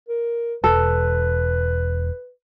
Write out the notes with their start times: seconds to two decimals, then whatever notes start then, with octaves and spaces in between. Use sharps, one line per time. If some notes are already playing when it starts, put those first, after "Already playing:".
0.09 A#4
0.64 E1 A4 B4